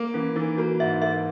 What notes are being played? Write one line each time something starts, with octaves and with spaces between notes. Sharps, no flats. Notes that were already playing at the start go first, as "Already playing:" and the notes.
Already playing: A#3
E3 C#4
E3 D#4
A#3 F#4
G#2 E5
A#3 E5